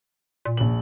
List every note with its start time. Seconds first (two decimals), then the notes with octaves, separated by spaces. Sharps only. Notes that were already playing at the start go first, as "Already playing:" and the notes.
0.45 A#2
0.57 A#1 F#7